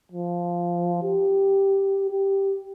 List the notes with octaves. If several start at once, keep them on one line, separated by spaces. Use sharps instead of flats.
F3
G4
G4